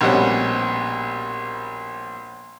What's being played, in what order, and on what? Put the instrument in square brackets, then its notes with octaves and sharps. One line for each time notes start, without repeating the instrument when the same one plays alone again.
[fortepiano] A#1 B2 G3 C4 C#4 F#5